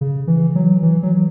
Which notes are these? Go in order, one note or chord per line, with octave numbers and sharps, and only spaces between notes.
C#3
E3
F#3
E3
F#3